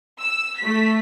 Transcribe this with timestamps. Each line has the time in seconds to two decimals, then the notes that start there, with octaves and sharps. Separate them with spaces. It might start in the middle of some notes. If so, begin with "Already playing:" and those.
0.19 E6
0.59 A3 B6